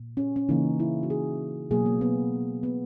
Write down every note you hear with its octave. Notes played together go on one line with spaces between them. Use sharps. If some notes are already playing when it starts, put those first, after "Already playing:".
Already playing: A#2
C#4
C#4
C#3 E3 A#3 D#4
E4
F#4
G#4
B2 F#3 A#3 G#4
A#3
B3
B3